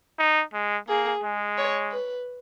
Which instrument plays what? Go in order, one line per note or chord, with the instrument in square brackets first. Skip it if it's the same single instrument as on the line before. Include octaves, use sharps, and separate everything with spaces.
[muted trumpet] D#4
G#3
[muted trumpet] A#3 [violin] G#4
[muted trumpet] G#3
[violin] C#5
B4